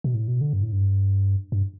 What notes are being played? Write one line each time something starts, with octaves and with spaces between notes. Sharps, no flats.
B2
A2
B2
D3
G2
A2
G2
G2